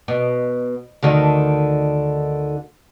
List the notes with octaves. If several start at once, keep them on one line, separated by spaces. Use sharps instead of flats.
B2
D2 D3 D#3